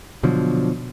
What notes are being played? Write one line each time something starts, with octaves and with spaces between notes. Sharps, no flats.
B2 D3 F3 F#3